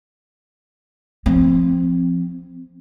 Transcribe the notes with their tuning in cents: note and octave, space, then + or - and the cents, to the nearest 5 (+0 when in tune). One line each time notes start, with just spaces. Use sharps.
F3 -15 C4 +0